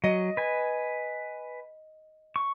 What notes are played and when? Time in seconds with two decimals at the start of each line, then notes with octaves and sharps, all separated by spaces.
0.04 F#3 D#5
0.37 B4 G#5
2.36 C#6